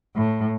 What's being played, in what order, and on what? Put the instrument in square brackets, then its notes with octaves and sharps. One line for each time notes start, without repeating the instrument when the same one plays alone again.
[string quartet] A2